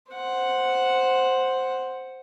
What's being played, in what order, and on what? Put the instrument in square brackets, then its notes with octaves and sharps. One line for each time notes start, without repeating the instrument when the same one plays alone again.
[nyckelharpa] C5 F#5